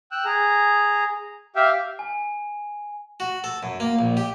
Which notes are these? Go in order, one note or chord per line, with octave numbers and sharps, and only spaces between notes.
G5 E6 F#6
G#4 A#5
G4 E5 F5 G5
G#5
F#4
A4
F#2
A#3
A#1
G4